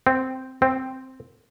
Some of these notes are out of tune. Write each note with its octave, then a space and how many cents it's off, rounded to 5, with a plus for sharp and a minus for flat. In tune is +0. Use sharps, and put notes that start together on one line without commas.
C4 -5
C4 +0